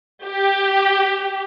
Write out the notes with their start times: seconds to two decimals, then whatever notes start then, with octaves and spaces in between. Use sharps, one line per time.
0.25 G4